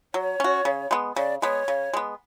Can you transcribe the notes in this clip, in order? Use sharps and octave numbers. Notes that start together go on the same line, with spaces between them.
F#3 C#5
C#4 F#4
C#3
G#3 B3
C#3 D5
G#3 B3 C#5
C#3
G#3 B3